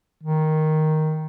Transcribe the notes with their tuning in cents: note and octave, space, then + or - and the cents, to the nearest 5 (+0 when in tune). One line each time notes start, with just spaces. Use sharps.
D#3 +0